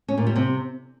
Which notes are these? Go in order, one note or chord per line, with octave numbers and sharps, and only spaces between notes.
C#4
A#2
G3
C3